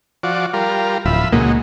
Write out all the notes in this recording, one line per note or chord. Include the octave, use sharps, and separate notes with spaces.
F3 F#4 D5
G3 F4 A#4
D1 F3 E5 B5
C#2 A#2 F#3 G#3 A#3 D#4